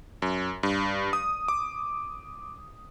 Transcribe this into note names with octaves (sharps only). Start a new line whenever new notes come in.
F#2
G2
D#6
D6